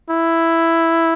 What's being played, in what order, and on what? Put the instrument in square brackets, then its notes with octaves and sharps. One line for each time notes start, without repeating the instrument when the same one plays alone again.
[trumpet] E4